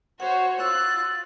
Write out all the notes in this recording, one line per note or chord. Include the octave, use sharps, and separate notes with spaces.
F#4 C5 C#5 F#5
F4 E6 F#6 A6